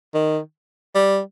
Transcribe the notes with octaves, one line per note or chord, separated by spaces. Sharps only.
D#3
G3